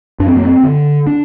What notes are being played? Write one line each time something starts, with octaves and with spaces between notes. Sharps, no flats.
F#2 D4
C4
A#3
C4
D3
D4